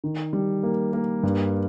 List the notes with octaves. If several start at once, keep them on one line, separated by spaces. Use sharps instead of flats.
D#3
G3
A#3
A#3
G2